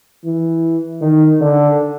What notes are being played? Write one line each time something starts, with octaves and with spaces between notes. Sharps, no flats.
E3
D#3
D3